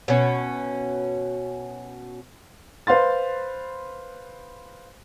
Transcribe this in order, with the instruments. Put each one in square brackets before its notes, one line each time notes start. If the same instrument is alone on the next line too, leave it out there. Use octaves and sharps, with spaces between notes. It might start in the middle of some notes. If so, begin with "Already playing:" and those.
[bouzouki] B2 C#4
[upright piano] B4 C5 F5 C6 A6